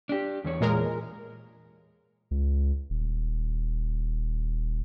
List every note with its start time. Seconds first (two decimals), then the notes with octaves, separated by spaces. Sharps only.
0.09 D4 G4
0.44 E2 E3 C#5
0.61 A#2 G#3 A#4
2.31 C#2
2.90 D#1